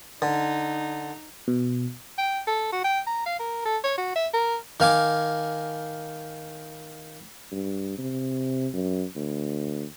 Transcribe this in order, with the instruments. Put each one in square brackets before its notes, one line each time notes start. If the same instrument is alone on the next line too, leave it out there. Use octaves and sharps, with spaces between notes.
[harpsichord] D3 [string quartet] D#4
[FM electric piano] B2
[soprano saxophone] G5
A4
F#4
G5
A#5
F5
A#4
A4
C#5
F#4
E5
A#4
[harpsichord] D#3 F5 G#5 D6
[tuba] G2
C3
F#2
D2